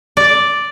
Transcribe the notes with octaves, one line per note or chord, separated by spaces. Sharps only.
D5